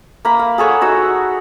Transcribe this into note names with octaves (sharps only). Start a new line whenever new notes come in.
A#3 A#5 B5
F5
G#4 A4 C#5 F#5
D#4 F#4 E6